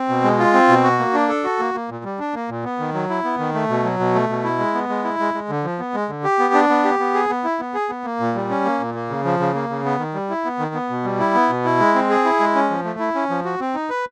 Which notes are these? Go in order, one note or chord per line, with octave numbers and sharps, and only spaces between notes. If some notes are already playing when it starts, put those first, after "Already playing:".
Already playing: C4
B2
G#3
F4
C4
B2
F#4
A#3
D4
A4
F#4
A#3
A#3
A#2
G3
D4
A#3
A#2
B3
D#3
F#3
E4
B3
D#3
A3
B2
F#3
B2
A3
B2
E4
G#3
B3
G#3
E4
G#3
G#3
D3
F3
B3
G#3
D3
G4
B3
D4
B3
G4
B3
G#4
B3
E4
B3
G#4
B3
A#3
A#2
G3
C#4
A#3
A#2
A#3
C#3
F3
C#3
A#3
C#3
B3
D#3
G3
E4
B3
D#3
B3
B2
G3
E4
B3
B2
E4
G#3
C4
G#4
E4
G#3
C#4
F3
A3
E4
C#4
F3
F#4
C4
D#4
B4